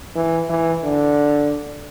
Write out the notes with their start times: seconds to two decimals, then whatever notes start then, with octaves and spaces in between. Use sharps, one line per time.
0.15 E3
0.50 E3
0.83 D3